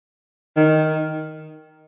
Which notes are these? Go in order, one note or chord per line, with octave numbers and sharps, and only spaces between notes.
D#3